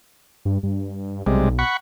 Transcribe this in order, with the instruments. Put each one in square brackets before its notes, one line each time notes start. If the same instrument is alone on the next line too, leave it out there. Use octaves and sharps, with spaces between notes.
[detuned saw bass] G2
G2
[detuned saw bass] B1 [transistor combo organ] C3 G3 G#3
[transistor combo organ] F#5 B5 C#6